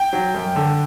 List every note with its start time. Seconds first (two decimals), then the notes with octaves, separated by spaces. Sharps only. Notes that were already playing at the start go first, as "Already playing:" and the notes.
Already playing: G5
0.13 F#3
0.34 F#2
0.56 D3